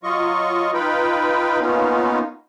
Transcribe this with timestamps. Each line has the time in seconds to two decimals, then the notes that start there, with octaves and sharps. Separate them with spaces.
0.03 F#3 F4 D#5 C#6
0.74 D#4 F4 B4 G5 B5
1.61 A#3 B3 C#4 D#4 F4